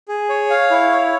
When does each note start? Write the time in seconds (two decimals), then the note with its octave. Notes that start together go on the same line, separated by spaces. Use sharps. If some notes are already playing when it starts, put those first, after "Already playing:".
0.08 G#4
0.29 C#5
0.50 F5
0.71 E4
0.92 C#5